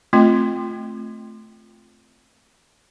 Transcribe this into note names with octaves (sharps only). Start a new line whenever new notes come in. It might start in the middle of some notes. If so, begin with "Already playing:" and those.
A3 C4 F4 G5